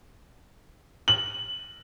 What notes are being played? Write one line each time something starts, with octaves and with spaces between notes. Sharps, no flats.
F#7